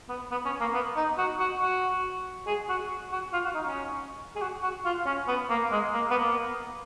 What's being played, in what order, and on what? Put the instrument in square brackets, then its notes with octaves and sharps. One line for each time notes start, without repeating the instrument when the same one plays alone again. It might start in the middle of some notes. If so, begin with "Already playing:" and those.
[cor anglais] B3
B3
C#4
A#3
B3
D#4
F#4
F#4
F#4
G#4
F#4
F#4
F4
F#4
D#4
C#4
G#4
F#4
F#4
F4
C#4
B3
A#3
G#3
A#3
B3
A#3